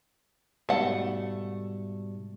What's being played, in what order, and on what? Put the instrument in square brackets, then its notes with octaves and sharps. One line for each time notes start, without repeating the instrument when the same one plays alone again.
[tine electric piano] G#2 B2 G3 [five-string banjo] A3 F#5